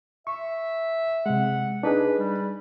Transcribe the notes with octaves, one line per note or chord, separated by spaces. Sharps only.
E5 C#6
C3 G#3 F#5
D4 D#4 G#4 B4
G3